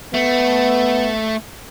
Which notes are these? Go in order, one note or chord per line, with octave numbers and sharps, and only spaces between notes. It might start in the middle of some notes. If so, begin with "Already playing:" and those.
A3 B3